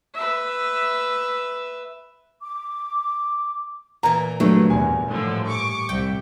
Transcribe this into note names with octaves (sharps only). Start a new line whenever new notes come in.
B4 E5
D6
A#2 E3 A#5
G2 F#3 A3 D4
E2 G#5
A2 D3 F3
C#6 D6
C2 G5